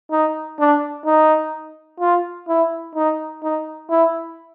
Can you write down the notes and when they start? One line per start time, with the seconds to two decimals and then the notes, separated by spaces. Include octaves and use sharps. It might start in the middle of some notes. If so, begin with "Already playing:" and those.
0.11 D#4
0.59 D4
1.05 D#4
2.00 F4
2.48 E4
2.95 D#4
3.42 D#4
3.90 E4